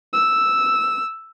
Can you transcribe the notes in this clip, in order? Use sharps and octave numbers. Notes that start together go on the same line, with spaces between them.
E6